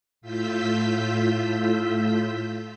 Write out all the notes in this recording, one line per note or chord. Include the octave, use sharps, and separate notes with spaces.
A2 F4 E6 G6 B6